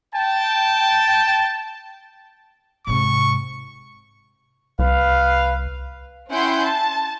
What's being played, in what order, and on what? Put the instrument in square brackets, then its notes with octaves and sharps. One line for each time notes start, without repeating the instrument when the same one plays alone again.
[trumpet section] G5 A5
[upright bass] G#2 C3 [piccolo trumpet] C#6
[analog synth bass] C2 [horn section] B4 F5
[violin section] C#4 E4 F#5 G5 C6 G6
A5